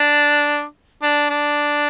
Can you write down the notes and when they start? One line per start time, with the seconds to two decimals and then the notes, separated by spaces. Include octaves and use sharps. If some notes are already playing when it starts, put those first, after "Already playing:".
Already playing: D4
1.03 D4
1.30 D4